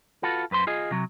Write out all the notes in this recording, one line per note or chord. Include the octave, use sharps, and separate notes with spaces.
F4 F#4 A4 B4
F#2 B4 C5 C6
F4 G#4 D#5
C3 F#3